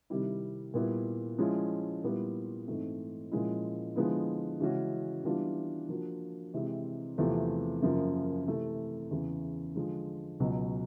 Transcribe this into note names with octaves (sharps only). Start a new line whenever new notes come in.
C3 D#3 G3 C4 E4
A#2 G3 B3 E4
F3 G#3 C#4 E4
A#2 G3 B3 E4
G#2 E3 A3 C4
A#2 F3 G#3 C#4 E4
D3 F3 G#3 B3 E4
C#3 E3 G#3 C#4 F#4
E3 G3 B3 D4 F4
F3 A#3 D4 F#4
C3 E3 G#3 C4 E4
E2 C3 F3 A3
F#2 C#3 F3 A#3
C3 E3 A3
E2 C#3 E3
D3 F3 G#3
C#2 B2 F#3